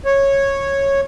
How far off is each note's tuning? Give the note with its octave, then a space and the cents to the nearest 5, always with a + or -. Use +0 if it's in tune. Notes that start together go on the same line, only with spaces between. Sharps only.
C#5 -10